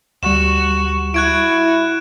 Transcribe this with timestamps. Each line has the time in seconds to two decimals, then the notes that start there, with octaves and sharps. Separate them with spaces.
0.23 D2 G3 F#4 E7
1.14 E4 F#4 F#6 G#6 D7